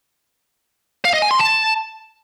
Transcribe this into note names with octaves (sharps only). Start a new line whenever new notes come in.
F5
D#5
G#5
C6
A5